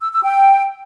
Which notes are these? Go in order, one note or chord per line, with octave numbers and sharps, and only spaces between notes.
E6
E6
G5